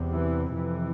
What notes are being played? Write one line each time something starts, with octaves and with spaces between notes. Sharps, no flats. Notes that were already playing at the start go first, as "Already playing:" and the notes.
Already playing: E2 C3
E3
F2 C3 E3